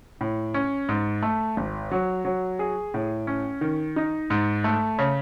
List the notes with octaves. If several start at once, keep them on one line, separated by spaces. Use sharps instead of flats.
A2
C#4
G#2
A3
G#1
F#3
F#3
G#4
A2
C#4
D#3
D#4
G#2
A3
C#3